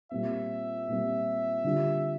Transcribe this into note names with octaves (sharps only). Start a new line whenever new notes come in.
A#2 G3 C4 E5
A#2 G3 C4
D3 G3 D4 F4